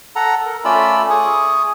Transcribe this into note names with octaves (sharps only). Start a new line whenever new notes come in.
A4 F#5 A#5
A#4
A3 C#4 F4 D5 B5 E6
G#4 C#6 D#6